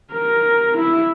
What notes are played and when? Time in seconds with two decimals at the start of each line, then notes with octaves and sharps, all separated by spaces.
0.13 A#4
0.78 E4